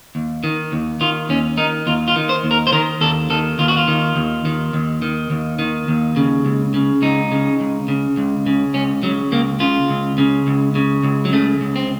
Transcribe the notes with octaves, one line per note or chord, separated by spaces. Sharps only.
D#2
D#3
D#2
D#3 F4
D#2 C#4
D#3 D#4
D#2 F4
F4
D#3
C5
D#2
A#4
C5
D#3 A#4
D#2 A4
D#3 A4
D#2 F4
F#4
F4
D#3
D#2
D#3
D#2
D#3
D#2
D#3
D#2
C#3
C#2
C#3
C#2 D#4
C#3
C#2
C#3
C#2
C#3
C#2 C#4
C#3 F#3
C#2 A#3
C#3 F4
C#2
C#3
C#2
C#3
C#2
F#3
C#3 A3
C#2
C4